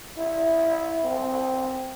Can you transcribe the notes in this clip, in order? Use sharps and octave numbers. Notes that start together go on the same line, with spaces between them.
E4
C4